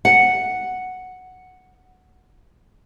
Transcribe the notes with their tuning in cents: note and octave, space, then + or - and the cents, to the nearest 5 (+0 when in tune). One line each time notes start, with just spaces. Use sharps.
F#5 +0